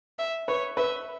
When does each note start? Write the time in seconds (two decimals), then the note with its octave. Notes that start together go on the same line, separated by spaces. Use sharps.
0.19 E5
0.48 B4 C#5
0.77 B4 E5